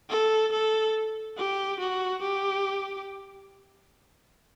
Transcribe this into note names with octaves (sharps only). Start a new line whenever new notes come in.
A4
A4
G4
F#4
G4